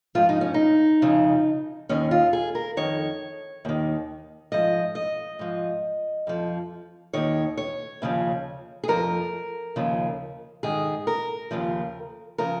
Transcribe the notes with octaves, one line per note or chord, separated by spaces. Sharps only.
G#2 F3 F4
D#4
C#4
D#4
F2 C#3 F3
D#2 D#3 C#4
F4
G#4
A#4
F2 D#3 C#5
D#2 D#3
G#2 F3 D#5
D#5
G#2 F3
F2 F3
D#2 D#3 C#5
C#5
D#2 C#3 F3
G#4
F2 F3 A#4
D#2 C#3 F3
G#2 D#3 G#4
A#4
D#2 C#3 F3
C#3 F3 A#4